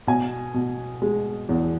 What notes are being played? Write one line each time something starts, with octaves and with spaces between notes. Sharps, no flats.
B2 G#5
B2
G#3
E2